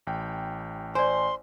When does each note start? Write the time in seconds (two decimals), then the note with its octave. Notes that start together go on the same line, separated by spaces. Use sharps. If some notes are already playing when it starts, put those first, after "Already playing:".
0.07 A1 G5
0.95 C5 D5 G#5 C6